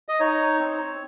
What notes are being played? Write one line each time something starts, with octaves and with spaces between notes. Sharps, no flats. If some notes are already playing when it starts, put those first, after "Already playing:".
D#5
D#4 C#5
C4